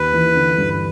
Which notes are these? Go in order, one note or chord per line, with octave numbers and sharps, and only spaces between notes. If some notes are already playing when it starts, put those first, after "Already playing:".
Already playing: D#2 D#3 B4
E3
D3
G2